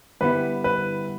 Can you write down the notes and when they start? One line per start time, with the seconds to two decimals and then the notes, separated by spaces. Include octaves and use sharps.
0.21 G2 D3 G3 B3 E4 B4
0.64 B4